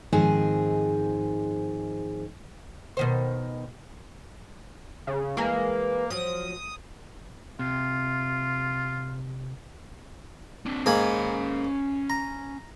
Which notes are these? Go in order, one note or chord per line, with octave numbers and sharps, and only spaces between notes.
G#2 D#3 F3 C4 G#4 G#5
B2 D#3 C5
C#3
E3 G#3 A#3 G#4
F3 F#3 D#6
C3 F4
C4 D4
G#2 A#3 C#4 G#5 B5
A#5